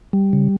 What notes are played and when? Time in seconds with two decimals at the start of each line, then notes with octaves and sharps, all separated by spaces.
0.13 G3
0.33 C#3